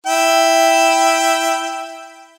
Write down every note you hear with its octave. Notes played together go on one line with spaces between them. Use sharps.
E4 G5